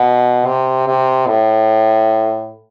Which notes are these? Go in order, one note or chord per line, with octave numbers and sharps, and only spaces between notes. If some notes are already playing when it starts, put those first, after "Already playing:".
Already playing: B2
C3
C3
A2